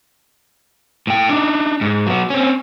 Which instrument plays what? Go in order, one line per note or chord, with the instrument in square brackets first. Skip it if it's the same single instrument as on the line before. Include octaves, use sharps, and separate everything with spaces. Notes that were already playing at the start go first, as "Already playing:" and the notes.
[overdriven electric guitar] A2 G5
D4 D#4
G#2
F#3 B3
C4 C#4